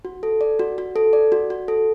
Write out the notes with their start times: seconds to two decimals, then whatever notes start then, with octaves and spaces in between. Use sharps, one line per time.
0.05 F#4
0.23 A4
0.41 D5
0.59 F#4
0.78 F#4
0.96 A4
1.13 D5
1.32 F#4
1.50 F#4
1.68 A4